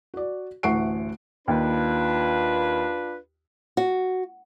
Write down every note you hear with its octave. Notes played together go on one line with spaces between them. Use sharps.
F#4 D5
A1 D2 F#5 C#6 C7 D7
D#2 D4 F4 B4
F#4